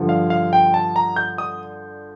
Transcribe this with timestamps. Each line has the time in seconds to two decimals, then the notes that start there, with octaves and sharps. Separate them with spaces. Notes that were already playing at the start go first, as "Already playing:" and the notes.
Already playing: G2 D3 F3
0.09 F5
0.30 F5
0.53 G5
0.74 A5
0.96 A#5
1.16 G6
1.38 D#6